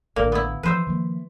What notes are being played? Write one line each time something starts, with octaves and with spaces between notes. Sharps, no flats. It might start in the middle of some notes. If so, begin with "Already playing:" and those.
A1 A#2 D3 A#3
B3 E4
E3 F3 B4 C5 E5
D#3 F3 A#3